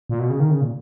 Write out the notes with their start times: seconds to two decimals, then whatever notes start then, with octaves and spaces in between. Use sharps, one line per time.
0.09 A#2
0.19 B2
0.30 C#3
0.40 D#3
0.51 C#3
0.61 A#2